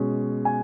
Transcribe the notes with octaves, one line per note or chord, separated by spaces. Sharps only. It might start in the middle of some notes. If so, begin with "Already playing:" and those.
Already playing: B2 G#3 C#4
G#5